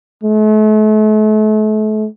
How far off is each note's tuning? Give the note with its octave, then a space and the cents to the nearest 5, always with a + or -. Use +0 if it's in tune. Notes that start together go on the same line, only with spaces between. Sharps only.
A3 -40